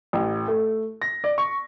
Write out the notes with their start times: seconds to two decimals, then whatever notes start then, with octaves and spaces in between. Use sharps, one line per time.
0.13 A1
0.48 A3
1.02 A#6
1.24 D5
1.38 C#6